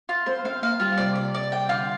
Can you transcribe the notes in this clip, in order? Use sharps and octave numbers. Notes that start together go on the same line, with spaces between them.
F4
C4 C5
C4 F5
A#3 F5
G3 F4
C3 D5
D5
D5
G5
D3 F4